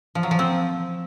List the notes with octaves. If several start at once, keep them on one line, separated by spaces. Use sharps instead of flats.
F3
F#3
F3
C4